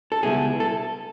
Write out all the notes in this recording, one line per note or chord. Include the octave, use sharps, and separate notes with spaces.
A4
C#2 B2 G3 B3 E4 G#4
A4